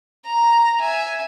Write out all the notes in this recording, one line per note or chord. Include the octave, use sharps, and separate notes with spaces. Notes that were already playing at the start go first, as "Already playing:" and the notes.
A#5
E5 G#5